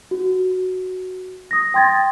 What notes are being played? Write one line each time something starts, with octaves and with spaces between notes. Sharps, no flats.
F#4
D#6 A#6
G5 C6 G#6 A6